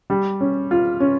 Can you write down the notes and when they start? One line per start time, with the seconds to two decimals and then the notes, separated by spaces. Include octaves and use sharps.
0.10 G3
0.41 C#4
0.71 F4
1.00 C#4